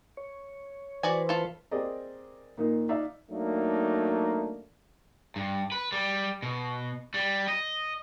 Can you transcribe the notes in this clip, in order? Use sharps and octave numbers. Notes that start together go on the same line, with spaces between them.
C#5
E3 F#4 B4 C5 D5 G#5
F4 A4
C4 G4 G#4 A#4 D5 D#5
A#2 D#3 A#3 D#4
D#4 D5 E5 F5
F#3 A3 A#3 D4 D#4
G2
B4
G3
B2
G3
D#5